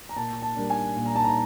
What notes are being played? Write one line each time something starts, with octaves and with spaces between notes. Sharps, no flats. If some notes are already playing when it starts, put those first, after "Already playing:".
A#5
A#2 A5
A5
G3 A#3 D4
G#5
A#2
A#5
A5
A#5